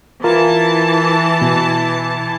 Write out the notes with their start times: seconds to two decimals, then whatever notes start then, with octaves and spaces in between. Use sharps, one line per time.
0.24 E3 F4 A#4 A5
1.42 B2